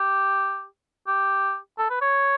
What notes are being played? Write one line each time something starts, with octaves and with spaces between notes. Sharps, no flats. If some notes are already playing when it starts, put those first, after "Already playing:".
Already playing: G4
G4
A4
B4
C#5